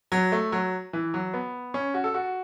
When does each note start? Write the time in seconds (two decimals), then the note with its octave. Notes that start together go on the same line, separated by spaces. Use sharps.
0.12 F#3
0.32 A3
0.52 F#3
0.93 E3
1.14 F#3
1.34 B3
1.74 C#4
1.94 F#4
2.04 A4
2.14 F#4